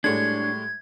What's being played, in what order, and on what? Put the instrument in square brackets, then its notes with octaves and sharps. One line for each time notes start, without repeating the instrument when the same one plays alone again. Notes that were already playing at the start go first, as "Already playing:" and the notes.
[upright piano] A2 G3 G#3 [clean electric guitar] D4 C#5 [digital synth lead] G#6